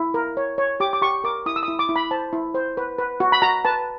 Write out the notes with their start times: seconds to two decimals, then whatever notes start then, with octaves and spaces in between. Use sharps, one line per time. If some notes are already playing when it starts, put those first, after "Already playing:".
Already playing: E4
0.14 A#4
0.37 C#5
0.58 C#5
0.80 G4 D6
0.93 D6
1.02 G4 C#6
1.24 A#4 D6
1.46 E4 D#6
1.56 E6
1.63 D#6
1.68 E4
1.79 D6
1.89 E4
1.96 B5
2.11 C5 A5
2.33 E4
2.55 C5
2.77 B4
2.99 B4
3.20 F#4
3.32 B5
3.42 F#4 A#5
3.65 B4 A5